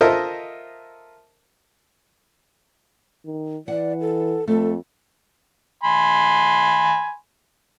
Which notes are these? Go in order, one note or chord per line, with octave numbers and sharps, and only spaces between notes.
F4 A4 A#4 C5 D#5 E5
D#3
E3 D5 F#5
A4
F2 A3 A4
G#5 B5 C6